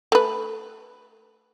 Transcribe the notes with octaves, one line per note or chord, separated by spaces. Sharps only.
A3 B4